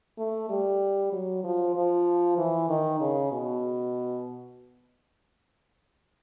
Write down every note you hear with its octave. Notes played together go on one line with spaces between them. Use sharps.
A3
G3
F#3
F3
F3
E3
D#3
C#3
B2